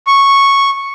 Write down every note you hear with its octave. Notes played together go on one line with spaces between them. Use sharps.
C#6